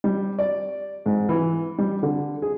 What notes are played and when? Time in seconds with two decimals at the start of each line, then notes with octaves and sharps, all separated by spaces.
0.04 G3
0.39 D5
1.06 G#2
1.29 E3
1.78 G3
2.03 D3
2.42 G#4